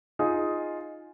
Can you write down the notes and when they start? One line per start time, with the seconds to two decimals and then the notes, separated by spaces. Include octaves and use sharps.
0.19 D#4 F4 G#4